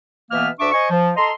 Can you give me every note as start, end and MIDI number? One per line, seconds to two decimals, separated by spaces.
0.31 0.48 47
0.31 0.48 52
0.31 0.48 58
0.31 0.48 59
0.31 0.48 76
0.31 0.48 89
0.60 0.70 38
0.60 0.70 62
0.60 0.70 76
0.60 0.70 85
0.60 0.70 86
0.71 0.86 72
0.71 0.86 75
0.71 0.86 80
0.71 0.86 85
0.90 1.11 53
1.16 1.31 69
1.16 1.31 75
1.16 1.31 82
1.16 1.31 84